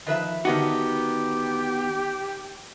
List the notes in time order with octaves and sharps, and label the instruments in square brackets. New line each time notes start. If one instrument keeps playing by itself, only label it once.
[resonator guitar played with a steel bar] D#3 B4 E5 [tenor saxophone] F3
[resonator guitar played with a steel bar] D3 D#4 [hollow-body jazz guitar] D#3 B3 F#4 [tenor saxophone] G4